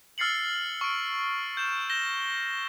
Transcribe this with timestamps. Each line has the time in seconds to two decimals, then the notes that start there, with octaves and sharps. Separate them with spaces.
0.18 E6 F6 A6 C7 C#7 F#7
0.81 C#6 D7
1.57 G6 E7
1.90 G6 A#6 E7 G7